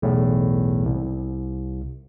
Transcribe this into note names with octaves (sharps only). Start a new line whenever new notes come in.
B1 E2 A2
C2